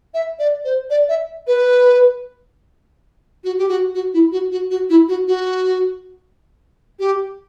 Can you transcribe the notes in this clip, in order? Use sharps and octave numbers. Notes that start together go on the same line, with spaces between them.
E5
D5
C5
D5
E5
B4
F#4
G4
F#4
F#4
E4
F#4
F#4
F#4
E4
F#4
F#4
G4